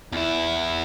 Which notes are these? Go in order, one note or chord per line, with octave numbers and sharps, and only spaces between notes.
E2 E4